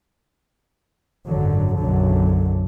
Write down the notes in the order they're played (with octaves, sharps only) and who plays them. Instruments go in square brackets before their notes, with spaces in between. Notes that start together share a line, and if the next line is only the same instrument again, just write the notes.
[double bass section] G#1 F#2 D3 F#3
B1 F#2 D3 F#3